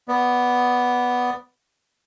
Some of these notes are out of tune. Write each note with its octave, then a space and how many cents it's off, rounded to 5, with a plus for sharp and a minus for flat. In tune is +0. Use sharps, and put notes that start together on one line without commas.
B3 +0 D5 +0